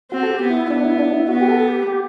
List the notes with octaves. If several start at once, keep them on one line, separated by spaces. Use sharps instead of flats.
C4 F#4
A4
G4
B3
E4
B3 D4
E4
D4
E4
B3 F#4
G4
A4
G4
G4